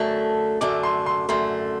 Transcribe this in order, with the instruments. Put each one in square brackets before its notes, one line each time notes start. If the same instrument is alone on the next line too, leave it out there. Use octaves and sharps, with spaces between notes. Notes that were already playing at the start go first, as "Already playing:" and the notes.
Already playing: [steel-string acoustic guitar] F#2 D3 A3
[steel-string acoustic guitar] F#2 D3 A3 [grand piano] D6
[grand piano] C6
C6
[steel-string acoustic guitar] F#2 D3 A3 [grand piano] C6